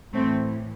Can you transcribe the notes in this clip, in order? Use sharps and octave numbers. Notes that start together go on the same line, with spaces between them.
A2 E3 A3 C4